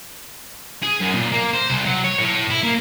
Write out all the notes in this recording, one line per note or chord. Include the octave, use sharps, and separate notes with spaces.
G#4
F#2
A#2
A#3
C5
C2
F#3
C#5
A2
E4
A#3